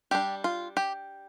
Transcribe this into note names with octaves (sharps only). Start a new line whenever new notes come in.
G3 D4 G4
F4
G4